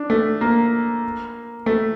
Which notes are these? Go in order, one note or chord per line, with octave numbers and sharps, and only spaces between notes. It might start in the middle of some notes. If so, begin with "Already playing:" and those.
Already playing: D4
A3
A#3
A3